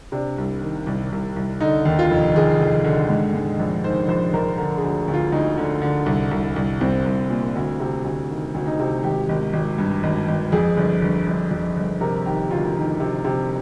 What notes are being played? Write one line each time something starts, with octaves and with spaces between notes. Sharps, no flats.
C3 D4
C2
D#3
C2
C2
C2
D3 D#4
D#2
F4
F1
D#2 G#4
F1
D3
G#2
G#2
A#1
D#3 C5
A#1 C5
A#1 A#4
D3 A#4
G#4
D2
D2
F4
D2 D#4
D3
D3
C2
C2
C2
C2 C4
C2
A#2
D2
C3
D2
D#3
D2
D#4
C3
G#1 G4
G#1
G#1
G2
G#1
G#1
F2 G#4
G1
G1
G1
F2
G1
C3 A#4
D#3 G4
D2 F4
D#3
C3
C3